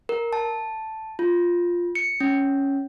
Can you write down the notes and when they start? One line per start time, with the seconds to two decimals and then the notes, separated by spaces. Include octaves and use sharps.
0.09 A#4
0.33 A5
1.19 F4
1.95 C#7
2.20 C#4